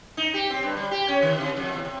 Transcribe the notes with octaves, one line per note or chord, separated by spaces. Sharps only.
D#4
G4
C4
G2
G3
G4
C#4
D#3
C3
F2
E2
C3